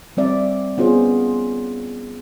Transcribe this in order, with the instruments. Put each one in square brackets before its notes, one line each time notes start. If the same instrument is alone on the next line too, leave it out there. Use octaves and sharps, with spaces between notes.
[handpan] G3 C4 D5 E5
B3 C#4 F4 G#4 C5